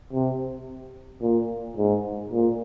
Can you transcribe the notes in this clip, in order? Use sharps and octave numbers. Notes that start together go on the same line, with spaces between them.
C3
A#2
G#2
A#2